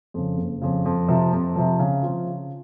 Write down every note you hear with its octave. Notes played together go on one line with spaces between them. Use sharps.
F2 C#3
F#1
F2 C#3
F2
C3 F3
F2
C3 F3
C#3
F3 C4 F4
C#3